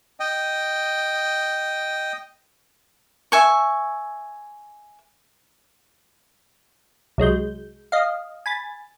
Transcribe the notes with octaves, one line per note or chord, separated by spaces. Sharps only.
D#5 G5
E5 G#5 C#6
C2 F#3 G#3 G6
D#5 F5
G#5 B5 A6